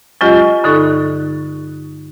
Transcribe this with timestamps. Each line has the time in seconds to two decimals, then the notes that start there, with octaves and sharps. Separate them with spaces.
0.21 F#3 G#3 C#4 F4 G4 D#5
0.63 G2 D3 D#4 A4 C#6 F#6